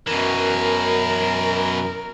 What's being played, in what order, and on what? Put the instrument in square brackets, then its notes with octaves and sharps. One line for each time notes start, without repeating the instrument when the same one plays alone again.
[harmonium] F#2 [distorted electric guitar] B2 E3 [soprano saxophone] A#4